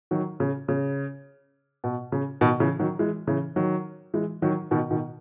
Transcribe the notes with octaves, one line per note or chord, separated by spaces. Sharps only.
D#3 F#3
C#3
C#3
B2
C#3
B2 D#3
C#3 E3
D#3 F#3
E3 G#3
C#3 E3
D#3 F#3
E3 G#3
D#3 F#3
B2 D#3
B2 D#3